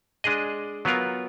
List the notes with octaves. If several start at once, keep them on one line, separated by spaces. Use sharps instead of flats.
G#3 D4 G#4 D#5
F#3 B3 F4 A#4